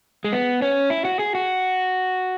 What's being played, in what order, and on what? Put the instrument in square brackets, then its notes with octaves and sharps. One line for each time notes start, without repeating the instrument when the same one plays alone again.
[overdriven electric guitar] G#3
B3
C#4
E4
F#4
G#4
F#4